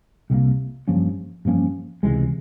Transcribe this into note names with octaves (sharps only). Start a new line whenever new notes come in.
C2 C3 G3 A#3
G2 F3 A#3 C#4
G2 F3 A#3 C#4
C#2 C3 E3 G#3